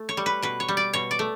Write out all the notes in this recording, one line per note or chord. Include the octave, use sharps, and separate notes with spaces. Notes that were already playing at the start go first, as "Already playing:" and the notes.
Already playing: A3
C#5
G3
B4
B2 B4
C#5
G3
D5
B2 C#5
D5
A3